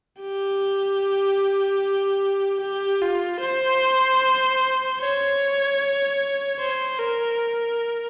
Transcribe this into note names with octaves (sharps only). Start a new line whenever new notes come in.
G4
G4
F4
C5
C#5
C5
A#4